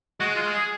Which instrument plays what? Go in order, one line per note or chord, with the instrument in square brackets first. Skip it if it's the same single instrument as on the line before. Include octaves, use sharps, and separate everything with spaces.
[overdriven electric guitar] G#3 [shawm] F#4
[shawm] F4
G#4